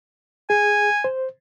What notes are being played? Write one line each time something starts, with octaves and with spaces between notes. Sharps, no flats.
G#4 G#5
C5